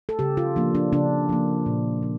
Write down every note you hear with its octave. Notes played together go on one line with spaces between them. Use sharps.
A4
C#3 G4
F4
F3 A#3 D4
D4
C#3 D4
F3 A#3
A#2
F3